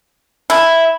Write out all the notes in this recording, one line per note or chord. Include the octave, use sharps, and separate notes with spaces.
E4